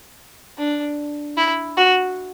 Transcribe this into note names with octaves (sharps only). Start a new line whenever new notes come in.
D4
E4
F#4